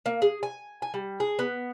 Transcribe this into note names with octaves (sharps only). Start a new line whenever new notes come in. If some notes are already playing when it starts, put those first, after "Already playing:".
A#3
G#4
G#5
G#5
G3
G#4
B3